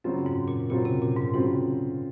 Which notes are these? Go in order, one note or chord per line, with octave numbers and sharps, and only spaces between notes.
F#2 C#3 F#3 C4 F4
G#2
A#2
A#2 C#3 F#3 C4 F4
C3
A#2
G#2
G#2 C#3 F#3 C4 F4